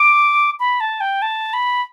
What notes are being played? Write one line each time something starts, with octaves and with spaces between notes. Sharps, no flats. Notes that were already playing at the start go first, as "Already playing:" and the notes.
Already playing: D6
B5
A5
G5
A5
B5